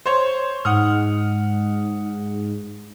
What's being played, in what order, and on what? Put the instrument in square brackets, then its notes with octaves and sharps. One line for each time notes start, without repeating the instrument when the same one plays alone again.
[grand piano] C5 C#5
[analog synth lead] G#2 [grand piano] F#5 D#6 F6